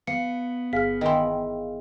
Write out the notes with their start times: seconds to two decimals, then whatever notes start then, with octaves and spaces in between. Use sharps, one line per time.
0.07 B3 F5 C#7
0.73 G1 G#4 F5 F6 B6
1.01 D#3 E3 D#5 G5 C6